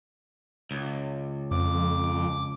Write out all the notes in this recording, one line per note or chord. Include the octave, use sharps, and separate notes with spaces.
C#2
F2 D6